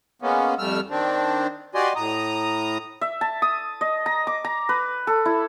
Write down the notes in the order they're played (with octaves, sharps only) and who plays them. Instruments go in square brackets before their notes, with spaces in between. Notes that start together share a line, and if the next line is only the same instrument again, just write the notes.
[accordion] G#3 A#3 B3 C#4
F2 G3 A3 E6 F6
D#3 C4 D4
F#4 G4 D5 D#5 G#5 C6
A2 A#5 D#6
[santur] E5
A5
D#6
D#5
A#5
D6
A#5
B4
A4
E4